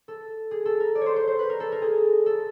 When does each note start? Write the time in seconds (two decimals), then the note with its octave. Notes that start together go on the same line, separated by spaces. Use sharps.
0.08 A4
0.51 G#4
0.65 A4
0.80 A#4
0.95 D5
1.01 C5 C#5
1.16 C5
1.27 C5
1.39 B4
1.50 A#4
1.60 A4
1.72 A#4
1.82 G#4
2.26 A4